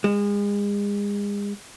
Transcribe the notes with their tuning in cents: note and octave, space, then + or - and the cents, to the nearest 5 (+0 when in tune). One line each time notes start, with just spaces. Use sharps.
G#3 -35